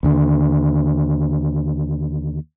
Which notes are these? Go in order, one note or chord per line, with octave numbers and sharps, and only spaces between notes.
D#2 D3